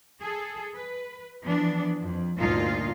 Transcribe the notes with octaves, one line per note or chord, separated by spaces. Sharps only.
G#4 A4
B4
E3 F3 B3 D4
F2
D2 G2 A#2 D#4 F4 F5